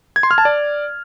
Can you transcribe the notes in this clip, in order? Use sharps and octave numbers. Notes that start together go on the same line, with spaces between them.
G#6
C6
F6
A5
D5